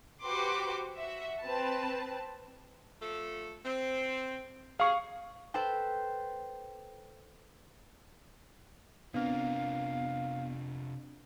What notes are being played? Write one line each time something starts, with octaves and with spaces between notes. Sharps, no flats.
F#4 G4 B4 C5 C6 D6
F#4 E5
C4 B4 A5
F3 A3 A4
C4
C3 F#3 G#4 F5 C#6
A4 B4 C5 G5
C3 B3 C4 D4 F4 A#4 F5